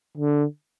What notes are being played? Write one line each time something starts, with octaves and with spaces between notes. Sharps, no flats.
D3